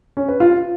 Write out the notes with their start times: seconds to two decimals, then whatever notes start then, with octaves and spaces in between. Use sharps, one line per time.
0.17 C#4
0.29 B4
0.40 F4